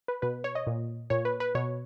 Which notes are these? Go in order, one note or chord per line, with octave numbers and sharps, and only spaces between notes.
B4
B2 B4
C#5
D#5
A#2
A#2 C#5
B4
B4
B2 C#5